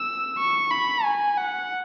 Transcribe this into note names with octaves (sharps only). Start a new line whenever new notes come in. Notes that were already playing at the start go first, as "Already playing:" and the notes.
Already playing: E6
C#6
B5
G#5
F#5